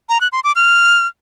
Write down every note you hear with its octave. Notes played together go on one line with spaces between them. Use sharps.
A#5
F#6
C6
D6
F6